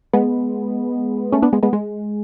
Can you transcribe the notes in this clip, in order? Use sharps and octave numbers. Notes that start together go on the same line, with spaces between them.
G#3 B3
A3 C#4
B3 D4
G#3 B3
G#3 B3
G#3